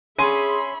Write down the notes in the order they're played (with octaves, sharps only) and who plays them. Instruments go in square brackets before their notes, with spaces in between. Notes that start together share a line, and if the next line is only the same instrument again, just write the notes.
[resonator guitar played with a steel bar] C#4 [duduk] G#4 [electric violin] E5 B5 [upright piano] C6 D#7